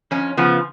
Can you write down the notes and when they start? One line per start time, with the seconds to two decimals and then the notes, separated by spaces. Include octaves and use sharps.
0.11 F2 C#4
0.37 C#3 F3 B3